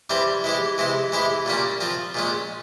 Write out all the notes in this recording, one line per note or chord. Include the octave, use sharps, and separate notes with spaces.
E3 G3 C4 G4
E3 G#3 E4 G4
C3 E3 G#3 E4
E3 G#3 E4 G4
A#2 G3 A#3 C#4
F3 C4 F4
A#2 G#3 C#4